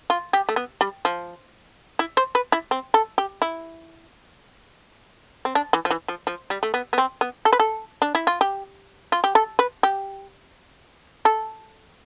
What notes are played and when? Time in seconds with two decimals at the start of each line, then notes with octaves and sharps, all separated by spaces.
0.10 F4
0.33 G4
0.49 A3
0.56 B3
0.81 G3
1.05 F3
1.99 E4
2.17 C5
2.35 B4
2.52 E4
2.71 C4
2.94 A4
3.18 G4
3.42 E4
5.45 C4
5.55 D4
5.73 E3
5.85 F3
5.90 E3
6.08 F3
6.27 F3
6.50 G3
6.63 A3
6.74 B3
6.93 B3
6.98 C4
7.21 B3
7.45 A4
7.53 B4
7.60 A4
8.02 D4
8.15 E4
8.27 F4
8.41 G4
9.12 F4
9.24 G4
9.35 A4
9.59 B4
9.83 G4
11.25 A4